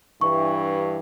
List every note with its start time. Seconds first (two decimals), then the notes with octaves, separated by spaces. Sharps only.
0.21 G2 E3 C#6